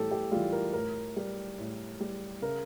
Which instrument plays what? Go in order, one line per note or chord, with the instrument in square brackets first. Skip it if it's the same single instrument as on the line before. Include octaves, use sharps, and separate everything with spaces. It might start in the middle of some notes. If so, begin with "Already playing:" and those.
Already playing: [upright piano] A2 E3 G3 G4 A4
G4
E3 G3 F4
A#4
A2 A#4
G3
A2
G3
C#3 A#4